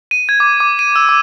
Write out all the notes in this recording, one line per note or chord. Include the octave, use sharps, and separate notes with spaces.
D#7
G#6
D6
D6
D#7
E6
D6